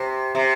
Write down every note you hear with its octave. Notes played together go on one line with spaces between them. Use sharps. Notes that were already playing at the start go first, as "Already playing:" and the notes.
Already playing: C3
C3